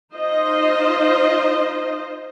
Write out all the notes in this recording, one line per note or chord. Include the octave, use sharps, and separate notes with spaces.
D#4 F4 C5 D#5